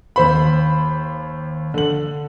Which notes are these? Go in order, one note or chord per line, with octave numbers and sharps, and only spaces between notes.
D#2 C5 B5
D3 F#7